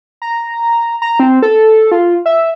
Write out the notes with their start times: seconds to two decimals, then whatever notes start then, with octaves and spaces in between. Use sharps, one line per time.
0.22 A#5
1.02 A#5
1.20 C4
1.42 A4
1.92 F4
2.26 E5